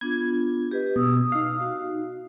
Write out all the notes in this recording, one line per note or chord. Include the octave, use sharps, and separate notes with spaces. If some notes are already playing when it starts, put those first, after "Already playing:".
B3 D4 F4 G#6
G4 B4 D#5
B2 D#6 E6
D#4 F5
F#4